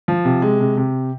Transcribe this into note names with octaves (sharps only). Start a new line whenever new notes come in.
F3
C3
G#3
C3
C3